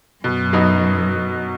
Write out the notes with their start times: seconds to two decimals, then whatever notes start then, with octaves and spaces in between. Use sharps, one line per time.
0.24 F#2 B2
0.53 F#3 B3 D#4 F#4